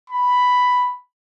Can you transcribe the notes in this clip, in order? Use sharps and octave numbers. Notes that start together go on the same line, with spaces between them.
B5